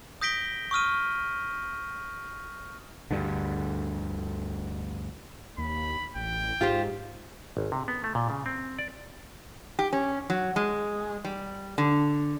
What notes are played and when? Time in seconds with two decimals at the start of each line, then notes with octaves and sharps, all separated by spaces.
0.21 D#6 G6 A#6 B6 D7 G7
0.71 C#6 D#6 F6 D#7
3.11 D2 G2 D3
5.58 D#2 B5
6.16 A1 G5
6.61 G#2 F4 G4 C5
7.57 G#1
7.72 C3
7.88 B3
8.04 A3
8.15 A#2
8.30 C#3
8.46 C4
8.79 D5
9.79 G4
9.93 C#4
10.30 F#3
10.56 G#3
11.25 G3
11.78 D3